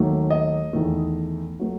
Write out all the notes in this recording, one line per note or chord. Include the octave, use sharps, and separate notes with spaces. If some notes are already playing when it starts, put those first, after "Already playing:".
Already playing: D#2 D#3 F#3 A3
D#5
E2 D#3 A3
F#3 A3